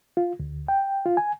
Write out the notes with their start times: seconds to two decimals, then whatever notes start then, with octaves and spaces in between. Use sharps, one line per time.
0.17 F4
0.40 D2
0.68 G5
1.06 F4
1.17 G#5